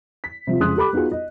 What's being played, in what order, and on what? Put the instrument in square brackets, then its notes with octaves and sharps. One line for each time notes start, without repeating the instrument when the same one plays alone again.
[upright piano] B6
C3 F3 F4
F2 C#3 G#3 C6 D#6 F#6
G4 A4 B5 D6
B3 D#4 F4 F#4 G#4
D#5